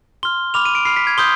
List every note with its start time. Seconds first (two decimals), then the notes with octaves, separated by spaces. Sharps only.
0.23 C6 F6 G7
0.54 B5 D6 F6 F7
0.65 D#7
0.75 D7
0.85 B5 F6 C7
0.97 B6
1.07 G#6
1.18 C6 D#6 G6 G7